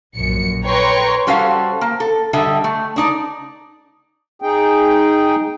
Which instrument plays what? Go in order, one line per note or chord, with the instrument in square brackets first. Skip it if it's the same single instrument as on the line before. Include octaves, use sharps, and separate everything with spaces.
[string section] A#1 F#2 C#7
B4 C#5 G5 A#5 C6 C#6
[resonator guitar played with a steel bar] G3 C#4 F#4 A4 C5 F5
A#3
A4
D3 G3 A4 D#5 E5
A3
D4 D#4 D5
[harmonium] D#4 G#4 G5